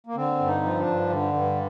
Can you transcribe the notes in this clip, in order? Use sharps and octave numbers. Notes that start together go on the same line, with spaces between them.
A#3
D3 C4
G2
D#4
F3
D4
G2
D3
G2